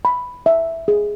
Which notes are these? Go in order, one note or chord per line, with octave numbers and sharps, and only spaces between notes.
B5
E5
G#4